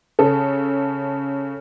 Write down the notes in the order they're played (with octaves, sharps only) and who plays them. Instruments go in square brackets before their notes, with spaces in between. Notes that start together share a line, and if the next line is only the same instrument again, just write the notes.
[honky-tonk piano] C#3 A4